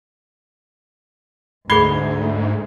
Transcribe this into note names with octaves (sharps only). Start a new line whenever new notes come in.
D2 G#2 G#4 B5 G#6 C7 G7